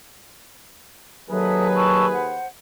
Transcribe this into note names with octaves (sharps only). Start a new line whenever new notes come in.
D#2 F#3 G#4 A4 B4 E5 D#6
A5 C#6 E6
C5 F#5